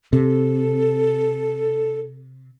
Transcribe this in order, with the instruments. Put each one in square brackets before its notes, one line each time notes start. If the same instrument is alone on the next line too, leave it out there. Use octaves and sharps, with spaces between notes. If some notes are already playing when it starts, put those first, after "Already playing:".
[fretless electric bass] C3 [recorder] A4